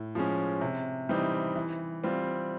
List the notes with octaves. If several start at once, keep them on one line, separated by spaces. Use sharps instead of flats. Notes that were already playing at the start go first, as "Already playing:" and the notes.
Already playing: A2
F3 G#3 C#4
C3
E3 G3 C4 D#4
E3
G3 C4 F4